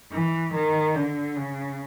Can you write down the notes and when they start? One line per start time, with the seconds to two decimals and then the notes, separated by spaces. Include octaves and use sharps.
0.12 E3
0.54 D#3
0.94 D3
1.36 C#3